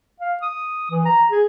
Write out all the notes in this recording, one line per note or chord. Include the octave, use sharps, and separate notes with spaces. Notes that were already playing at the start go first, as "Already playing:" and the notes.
F5
D#6
E3
A#5
G#4